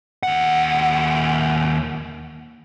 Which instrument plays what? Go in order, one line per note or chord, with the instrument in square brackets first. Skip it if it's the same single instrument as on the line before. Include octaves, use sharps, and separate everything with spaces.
[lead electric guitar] D#2 F#5